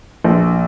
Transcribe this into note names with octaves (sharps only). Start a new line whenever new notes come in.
A#1